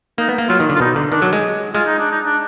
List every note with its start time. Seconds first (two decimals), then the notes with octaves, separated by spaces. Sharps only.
0.18 A#3 D#4
0.29 B3
0.38 A#3
0.49 F#3 F4
0.60 D#3
0.70 D3
0.75 F4
0.80 B2 D#4
0.96 D3
1.12 D#3 D4
1.22 F#3
1.33 G#3
1.74 G#3 F4
1.86 D#4
1.99 D4
2.11 D#4
2.25 D4